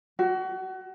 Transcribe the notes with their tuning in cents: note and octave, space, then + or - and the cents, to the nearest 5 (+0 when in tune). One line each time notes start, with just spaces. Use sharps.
F#4 +30